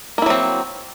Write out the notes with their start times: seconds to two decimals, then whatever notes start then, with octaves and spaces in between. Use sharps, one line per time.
0.18 A#3
0.22 E4
0.26 F#3
0.30 C4